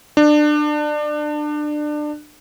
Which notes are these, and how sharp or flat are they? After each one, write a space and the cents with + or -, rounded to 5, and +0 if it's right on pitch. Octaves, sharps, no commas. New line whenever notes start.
D4 +25